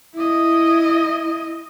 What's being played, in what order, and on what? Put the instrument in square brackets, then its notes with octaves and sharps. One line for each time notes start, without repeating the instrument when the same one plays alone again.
[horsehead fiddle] E4 D#5